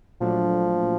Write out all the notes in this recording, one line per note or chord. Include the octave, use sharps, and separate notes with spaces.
A#2 F3 F#3 A3 D4
A#2